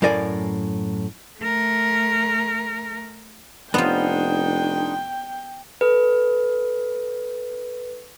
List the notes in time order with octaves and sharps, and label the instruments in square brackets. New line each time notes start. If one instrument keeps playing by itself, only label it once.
[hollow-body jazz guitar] F#2 A2 A#4 D5 G#5
[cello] A3 A#4
[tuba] F1 [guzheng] B3 F4 [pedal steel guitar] D4 D#4 C5 [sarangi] G5
[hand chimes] A4 B4